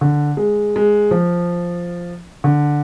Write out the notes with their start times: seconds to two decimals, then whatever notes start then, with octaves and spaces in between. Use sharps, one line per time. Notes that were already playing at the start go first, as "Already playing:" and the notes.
0.01 D3
0.37 G#3
0.76 G#3
1.11 F3
2.44 D3